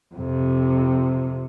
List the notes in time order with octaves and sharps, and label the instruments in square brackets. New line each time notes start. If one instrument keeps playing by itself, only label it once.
[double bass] F2 C3